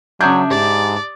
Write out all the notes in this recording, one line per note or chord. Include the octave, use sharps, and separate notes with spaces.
C#3 F#3 D4 E5 D#6 G6 G#6
G#2 G4 D5